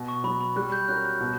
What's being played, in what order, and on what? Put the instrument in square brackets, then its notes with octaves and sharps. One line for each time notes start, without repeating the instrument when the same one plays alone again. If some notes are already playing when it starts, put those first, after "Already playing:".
Already playing: [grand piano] B2
[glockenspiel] C#6
[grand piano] F#3 B3 [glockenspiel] B5
[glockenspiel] B5
[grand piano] G3 [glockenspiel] F#6
[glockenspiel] G6
[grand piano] C#4 F#4 A#4 [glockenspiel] F#6
[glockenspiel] F#6
[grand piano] B2